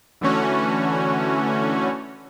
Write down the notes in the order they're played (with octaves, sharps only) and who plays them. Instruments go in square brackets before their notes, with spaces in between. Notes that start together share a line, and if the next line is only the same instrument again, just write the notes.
[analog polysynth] D3 E3 A3 C#4 F#4